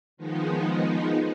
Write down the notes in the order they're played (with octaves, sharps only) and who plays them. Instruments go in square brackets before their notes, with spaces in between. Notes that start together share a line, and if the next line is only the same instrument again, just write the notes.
[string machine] D#3 F3 G#3 B3 D#4